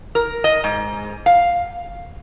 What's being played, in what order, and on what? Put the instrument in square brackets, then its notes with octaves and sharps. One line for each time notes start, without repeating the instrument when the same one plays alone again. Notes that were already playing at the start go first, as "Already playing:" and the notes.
[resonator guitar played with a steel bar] A#4
D#5
G#2
F5